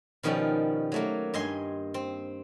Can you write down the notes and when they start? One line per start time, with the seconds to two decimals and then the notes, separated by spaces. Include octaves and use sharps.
0.23 B2 D#3 F3 G3 C#4
0.92 F#3 A3 A#3
1.34 G2 D#5 G#5 C6
1.94 C4